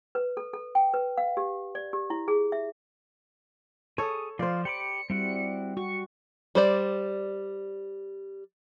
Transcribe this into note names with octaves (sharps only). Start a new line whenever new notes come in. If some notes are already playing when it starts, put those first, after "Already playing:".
B4
A4
A4
G5
B4
F5
G4
D5
G4
E4
G#4
E5
G#4 A4 C#5 D#6
F3 F4 C5 D5 F5
G4 B5 D6 C#7
G3 C4 E4 F#4
F#4 C#6
G3 C5 D5